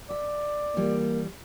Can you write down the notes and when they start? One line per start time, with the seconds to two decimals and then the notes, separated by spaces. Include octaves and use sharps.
0.10 D5 E5
0.76 E3 G3 A#3 F4